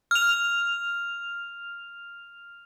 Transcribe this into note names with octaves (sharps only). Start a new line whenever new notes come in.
F6 F7